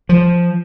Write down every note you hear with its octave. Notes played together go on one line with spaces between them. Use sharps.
F3